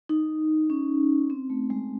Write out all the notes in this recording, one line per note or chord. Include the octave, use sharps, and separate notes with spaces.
D#4
C#4
C4
A3
G#3